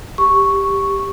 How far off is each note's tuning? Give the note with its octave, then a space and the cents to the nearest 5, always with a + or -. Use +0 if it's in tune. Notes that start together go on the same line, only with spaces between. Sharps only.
G4 +10 C#6 +0